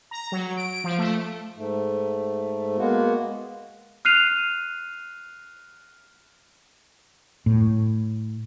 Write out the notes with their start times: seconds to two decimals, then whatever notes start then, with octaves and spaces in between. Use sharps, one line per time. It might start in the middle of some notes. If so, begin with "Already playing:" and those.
0.11 A#5
0.32 F#3
0.57 D7
0.84 F3
0.98 A3
1.57 G#2 A3
2.78 G#3 A#3 B3 F#4
4.05 F6 F#6 C7 D#7 F7
7.46 A2